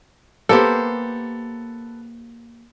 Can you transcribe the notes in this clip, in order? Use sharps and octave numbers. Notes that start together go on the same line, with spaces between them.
A#3 B3 G4 A4 C5